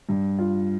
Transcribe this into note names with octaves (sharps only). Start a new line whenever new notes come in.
G2
F4